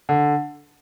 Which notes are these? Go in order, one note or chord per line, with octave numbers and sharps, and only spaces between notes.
D3